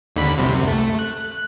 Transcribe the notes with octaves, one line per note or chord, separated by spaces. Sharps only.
D#2 D3 B5
C2 F#2 C3
A3
F#6